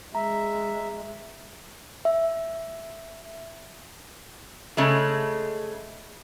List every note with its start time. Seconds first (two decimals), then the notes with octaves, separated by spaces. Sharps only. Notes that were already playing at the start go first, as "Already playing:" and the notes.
0.15 G#3 E5 A#5
2.05 E5
4.77 C#3 G#3 A3